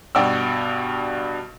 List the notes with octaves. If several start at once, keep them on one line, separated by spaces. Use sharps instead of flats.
G2 B2 D5 F#5 G5 E6